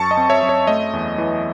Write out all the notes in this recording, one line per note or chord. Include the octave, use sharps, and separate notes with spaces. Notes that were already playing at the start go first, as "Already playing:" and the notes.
Already playing: F#2 A5 C#6
D#5
C4
C#5 E5
F#2
C#5
A3 D#5
E2
E3